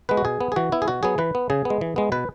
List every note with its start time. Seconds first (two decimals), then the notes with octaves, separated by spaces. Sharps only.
0.09 G#3 B3 B4
0.17 F#4
0.25 B2 G#4
0.41 B3
0.52 G#4
0.56 E3 F#4
0.72 B3 E4
0.82 G#4
0.88 B2 F#4
1.03 F#3 B3 G#4
1.18 E3 B4
1.35 B3
1.50 C#3 G#4
1.65 G#3 B3
1.81 E3
1.96 G#3 B3
2.12 B2 B4